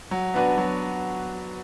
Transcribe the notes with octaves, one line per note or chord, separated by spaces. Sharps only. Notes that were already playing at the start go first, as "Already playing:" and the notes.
F#3
B3 D4 F#4 B4
F#3